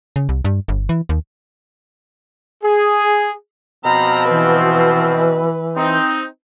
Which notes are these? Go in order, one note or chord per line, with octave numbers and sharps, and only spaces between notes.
C#3
C2
G2
G1
E3
D#2
G#4
B2 F3 C4 A#5 B5
E3 B4
C4 D#4